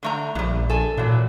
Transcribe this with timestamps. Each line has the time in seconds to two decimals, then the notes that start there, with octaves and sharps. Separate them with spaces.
0.03 D3 A3 A#5
0.35 A#1 E3 G3
0.70 A4 G#5
0.97 A#2 E3 F#3